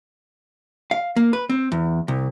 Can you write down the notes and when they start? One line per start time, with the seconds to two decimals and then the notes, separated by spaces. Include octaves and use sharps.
0.91 F5
1.16 A#3
1.33 B4
1.50 C4
1.72 E2
2.08 C2